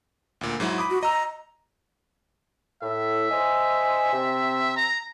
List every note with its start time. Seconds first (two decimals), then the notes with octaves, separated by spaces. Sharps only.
0.41 D2 A#2
0.60 G#2 F#3 E4
0.78 B5 D6 D#6
0.90 F#4
1.03 D#5 A#5 E6
2.82 A2 E5
3.31 C5 D#5 G#5
4.12 C3 C4
4.76 A#5